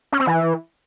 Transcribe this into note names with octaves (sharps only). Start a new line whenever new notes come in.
C#4
C4
E3